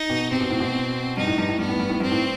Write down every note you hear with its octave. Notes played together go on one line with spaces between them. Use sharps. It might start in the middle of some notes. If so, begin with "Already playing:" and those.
Already playing: D#4
B2
C3 C4
B2
A2
B2
G2 D#4
A2
G2
A2
G2 B3
A2
G2
A2
G2 C4
A2